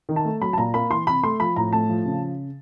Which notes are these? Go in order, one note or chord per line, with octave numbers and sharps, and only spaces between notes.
D#3
A5
A3
F#3 B5
A5
A#2 A#5
A#3 B5
E3 C6
C3 B5
A3 C6
F3 B5
A2 A#5
A3 A5
F3
C#3